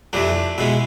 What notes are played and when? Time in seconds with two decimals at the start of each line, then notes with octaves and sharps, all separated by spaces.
0.13 F2 C3 E3 A3 D4
0.58 B2 G#3 B3 E4